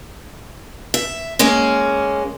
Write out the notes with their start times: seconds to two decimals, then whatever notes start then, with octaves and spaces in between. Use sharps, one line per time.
0.94 E5
1.39 G#3 A#3 C#4